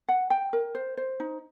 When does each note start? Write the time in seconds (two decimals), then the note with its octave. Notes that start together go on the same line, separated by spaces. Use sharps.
0.08 F#5
0.30 G5
0.53 A#4
0.75 C5
0.97 C5
1.20 D#4